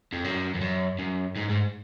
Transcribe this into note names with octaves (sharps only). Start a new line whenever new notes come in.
F2
F#2
F2
F#2
F#2
G#2
G#2